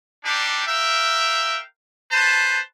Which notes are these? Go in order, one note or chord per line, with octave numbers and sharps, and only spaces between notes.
G3 D4 D#4 G4
A#4 E5 F5 G5
B4 C5 A5